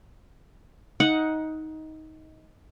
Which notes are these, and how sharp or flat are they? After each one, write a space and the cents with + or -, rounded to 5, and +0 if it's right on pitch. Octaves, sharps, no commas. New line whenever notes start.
D#4 +15 F#5 -5